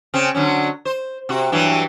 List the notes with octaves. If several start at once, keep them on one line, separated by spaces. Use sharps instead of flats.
C#3 C4
D3 F#3 C#4
C5
C3 F#4
G2 E3 F#3